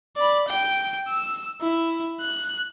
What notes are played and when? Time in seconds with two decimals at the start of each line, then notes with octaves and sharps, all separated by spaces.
0.17 D5 B5
0.48 G5 D7
1.08 E6
1.61 E4
2.20 F#6